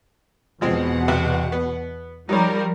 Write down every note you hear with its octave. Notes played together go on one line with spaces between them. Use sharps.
E2 B2 F3 G#3 C4 F#5
C3 B3 F#4
B3
F3 G3 D#4 A#4 C#5